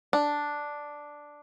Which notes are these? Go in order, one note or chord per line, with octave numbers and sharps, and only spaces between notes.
D4